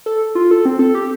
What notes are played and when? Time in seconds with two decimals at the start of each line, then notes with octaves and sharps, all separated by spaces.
0.06 A4
0.35 F4
0.51 A4
0.65 C4
0.79 A4
0.95 G4